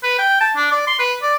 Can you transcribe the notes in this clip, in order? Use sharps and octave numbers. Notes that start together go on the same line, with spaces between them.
B4
G5
A5
D4
D5
C6
B4
D5